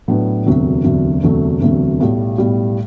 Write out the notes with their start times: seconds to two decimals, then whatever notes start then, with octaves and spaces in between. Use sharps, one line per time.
0.08 A2 F#3 B3 D4
0.46 E1 D2 C3 F#3
0.84 E1 D2 C3 F#3
1.23 E1 D2 C3 F#3 A3
1.61 E1 D2 C3 F#3 A3
2.00 B1 A2 G3
2.38 B1 A2 G3